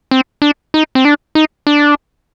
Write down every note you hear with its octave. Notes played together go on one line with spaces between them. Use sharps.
C4
D4
D#4
C4
D4
D#4
D4